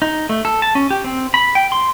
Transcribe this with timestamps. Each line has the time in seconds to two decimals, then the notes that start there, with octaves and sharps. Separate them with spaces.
0.02 D#4
0.29 A3
0.45 A4
0.62 A5
0.75 C#4
0.91 G4
1.04 C4
1.34 B5
1.55 G5
1.72 C6